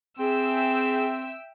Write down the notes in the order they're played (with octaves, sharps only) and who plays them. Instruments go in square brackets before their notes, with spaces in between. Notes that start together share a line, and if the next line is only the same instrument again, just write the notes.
[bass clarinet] C4 [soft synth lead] G#4 [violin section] E5 G5 E6